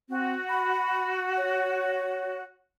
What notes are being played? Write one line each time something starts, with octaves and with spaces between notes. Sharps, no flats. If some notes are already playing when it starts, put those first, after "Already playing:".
C4 F#4
B5
C#5